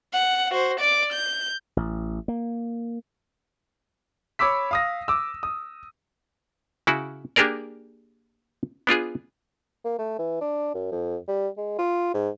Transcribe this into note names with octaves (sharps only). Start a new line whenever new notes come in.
F#5
F#4 C5
D5 D6
G6
A1
A#3
C#5 B5 D6 E6 B6
F5 D#6 A#6
D6 E6
D#6
C#3 E4 F#4
A#3 D4 G4 G#4 A#4 D5
B3 D4 F4 G#4
A#3
A3
E3
D4
F#2
F2
G3
G#3
F4
G#2